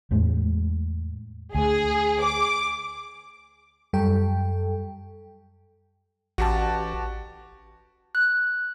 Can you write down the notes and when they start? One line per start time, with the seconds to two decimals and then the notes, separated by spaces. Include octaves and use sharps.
0.11 E2 A2 G#3
1.55 D2 G#4
2.22 D6
3.93 F#2 G3 A4 G5
6.38 A1 F#4 G4 A5
8.15 F#6